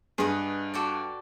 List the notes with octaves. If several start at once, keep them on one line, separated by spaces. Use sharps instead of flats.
G2 G#4 B4 D#5 F#5
F#4 A4 D5 G5